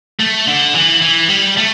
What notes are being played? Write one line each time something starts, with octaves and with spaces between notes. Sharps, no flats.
A3
D3
E3
E3
G3
A3